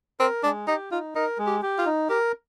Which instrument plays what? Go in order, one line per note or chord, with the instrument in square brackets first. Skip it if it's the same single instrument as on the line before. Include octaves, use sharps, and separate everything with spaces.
[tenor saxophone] C4 [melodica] A#4
[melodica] G#3 [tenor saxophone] D4
[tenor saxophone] D#4 [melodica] G4
[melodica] D#4 [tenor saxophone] F4
[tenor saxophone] D#4 [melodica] A#4
[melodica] G#3
[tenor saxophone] G4
[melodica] G4
[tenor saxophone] F4
[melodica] D#4
[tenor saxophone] G4 [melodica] A#4